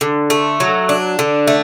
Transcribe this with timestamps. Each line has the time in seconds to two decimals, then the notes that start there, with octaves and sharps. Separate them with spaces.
0.01 D3
0.30 A3
0.60 F#3
0.89 D4
1.19 D3
1.47 A3